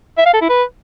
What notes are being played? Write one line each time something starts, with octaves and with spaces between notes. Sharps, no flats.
E5
F5
A4
E4
B4